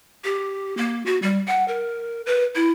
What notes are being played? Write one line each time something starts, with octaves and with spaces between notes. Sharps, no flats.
G4
A#3
F#4
G3
F#5
A#4
B4
E4